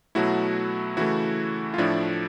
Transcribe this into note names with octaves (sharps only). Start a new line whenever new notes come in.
B2 F#3 A3 E4 F#4
C#3 E3 A3 E4 F#4
F4
A2 F3 A3 D4 E4